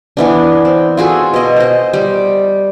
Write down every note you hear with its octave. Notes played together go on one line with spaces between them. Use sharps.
E3 B3 D4
C4
F4 F#4 G#4 A4
B2 D#5
C5 D#5
G3